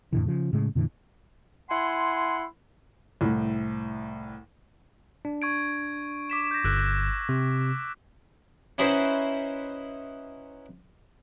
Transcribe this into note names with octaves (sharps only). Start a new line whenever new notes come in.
F2 A2 D3 E3
C#3 F3
A2 C#3 G#3
F2 A#2 D3 E3
E4 F#5 G#5 C6
C2 A2
D4
C#6 G#6 D7
D6 B6 E7
G6 A#6
G1 E6 F#6 D7
C3
C#4 D#4 E4 F#4 B4 C5